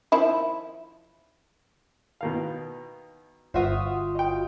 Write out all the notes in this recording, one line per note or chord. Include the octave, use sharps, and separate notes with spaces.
D#3 F3 E4
B2 D#3 F5
G1 F4 F#4 C5 E5 F5 D#6
D#5 G5